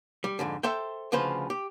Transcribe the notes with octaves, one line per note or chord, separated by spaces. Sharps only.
G3
F2 G#2 D3
A4 C5 E5 G5
D2 C#3 F3 B4 C5
G4